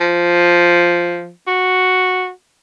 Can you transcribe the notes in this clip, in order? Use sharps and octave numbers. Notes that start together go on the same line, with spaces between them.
F3
F#4